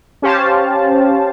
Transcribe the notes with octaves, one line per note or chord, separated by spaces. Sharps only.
C#4 G4 C5 F5 A5